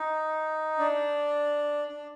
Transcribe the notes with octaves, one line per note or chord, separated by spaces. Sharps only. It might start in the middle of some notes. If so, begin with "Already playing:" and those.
Already playing: D#4
D4
D4